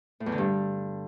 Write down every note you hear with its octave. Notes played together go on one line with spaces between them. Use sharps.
A2
E2
D3
G2